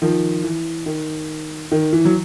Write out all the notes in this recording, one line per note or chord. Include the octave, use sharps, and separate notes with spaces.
D#3 F3
E3
D#3
D#3
E3
F#3